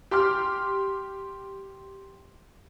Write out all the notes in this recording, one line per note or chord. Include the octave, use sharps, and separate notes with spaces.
G4 C6 D6 F6